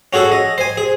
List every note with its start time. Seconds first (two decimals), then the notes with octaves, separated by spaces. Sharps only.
0.13 C#4 F#4 G#4 A4
0.32 D#5
0.58 C5 G#5
0.77 G#4